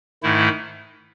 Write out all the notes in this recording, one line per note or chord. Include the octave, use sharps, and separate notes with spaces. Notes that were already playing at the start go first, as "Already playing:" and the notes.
G#2 D#3 A3 E4